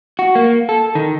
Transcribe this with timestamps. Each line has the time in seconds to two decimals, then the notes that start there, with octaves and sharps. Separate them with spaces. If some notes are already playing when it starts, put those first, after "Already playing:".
0.19 F#4
0.35 A#3
0.69 A4
0.95 D#3